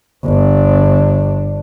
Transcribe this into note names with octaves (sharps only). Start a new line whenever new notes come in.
G1 D4